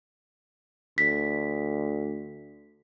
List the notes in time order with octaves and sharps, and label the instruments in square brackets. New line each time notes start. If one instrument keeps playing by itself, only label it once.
[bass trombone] D2 [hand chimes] B6